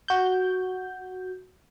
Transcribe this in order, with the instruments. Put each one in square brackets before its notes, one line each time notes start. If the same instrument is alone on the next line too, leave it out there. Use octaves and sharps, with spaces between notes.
[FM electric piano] F#4 G6